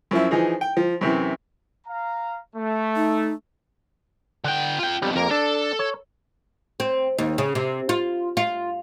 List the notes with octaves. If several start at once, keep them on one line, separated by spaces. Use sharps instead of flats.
F#2 F3 E4
E3 F3 D#4 G#4
G5
F3
F#2 C3 E3
F5 A#5
A3
D#4
D3 F#5 G5
F4 G5
B1 F2 G3
F2 A#3 A#4
D4 A4
C#5
C4
D#2
C#3
C3
F4
F4